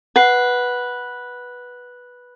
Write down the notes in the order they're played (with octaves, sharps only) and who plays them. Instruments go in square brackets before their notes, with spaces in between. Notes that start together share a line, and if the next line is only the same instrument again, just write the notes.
[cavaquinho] B4 [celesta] F#5 C7